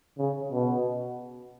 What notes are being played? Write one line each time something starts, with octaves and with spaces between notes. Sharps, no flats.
C#3
B2